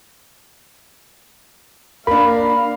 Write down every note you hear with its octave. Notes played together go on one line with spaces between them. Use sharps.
A#3 D4 F5 B5